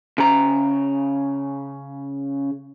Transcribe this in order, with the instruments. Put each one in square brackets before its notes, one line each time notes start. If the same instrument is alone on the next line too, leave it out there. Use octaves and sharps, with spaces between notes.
[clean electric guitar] C#3 A#5